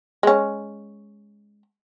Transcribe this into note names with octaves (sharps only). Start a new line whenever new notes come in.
G#3 C#4